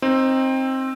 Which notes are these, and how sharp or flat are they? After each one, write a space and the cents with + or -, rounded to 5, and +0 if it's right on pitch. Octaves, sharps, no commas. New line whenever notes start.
C4 +15 D#4 +0